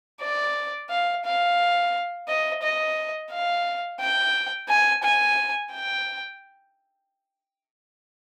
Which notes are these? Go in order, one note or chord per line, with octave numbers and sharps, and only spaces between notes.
D5
F5
F5
D#5
D#5
F5
G5
G#5
G#5
G5